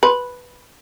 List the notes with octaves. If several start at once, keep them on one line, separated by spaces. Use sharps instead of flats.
B4